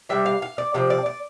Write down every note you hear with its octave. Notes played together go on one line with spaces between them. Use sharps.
C3 G3 D4 E5
F5
F5
D5
C3 F3 C4 D5
D5
D5